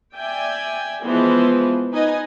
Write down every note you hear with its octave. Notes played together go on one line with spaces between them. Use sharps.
D5 E5 G5 G#5
E3 F3 G#3 B3 B4 C5
D#4 B4 D#5 G#5